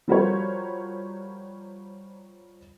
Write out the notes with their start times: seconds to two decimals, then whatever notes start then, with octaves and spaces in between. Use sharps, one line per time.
0.08 F3 G3 F#4 A#4 C5 C#5